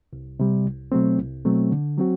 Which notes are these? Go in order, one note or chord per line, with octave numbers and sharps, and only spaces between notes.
C2
C3 G3
C2
B2 F#3 A3 C4
C2
B2 F#3 A3 C4
D3
F#3 C4 F#4